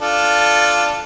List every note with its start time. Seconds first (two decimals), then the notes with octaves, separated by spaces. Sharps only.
0.01 D4 F4 A4